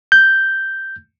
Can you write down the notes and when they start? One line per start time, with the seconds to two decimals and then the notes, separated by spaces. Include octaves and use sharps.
0.12 G6